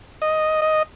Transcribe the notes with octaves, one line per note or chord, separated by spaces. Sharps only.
D#5
D#5